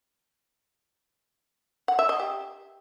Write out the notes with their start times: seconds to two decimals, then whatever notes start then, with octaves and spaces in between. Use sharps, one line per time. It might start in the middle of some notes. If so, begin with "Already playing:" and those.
1.88 F#5
1.99 E5
2.09 D#5
2.20 G4